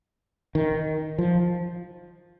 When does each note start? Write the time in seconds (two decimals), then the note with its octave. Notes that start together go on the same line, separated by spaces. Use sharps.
0.55 D#3
1.18 F3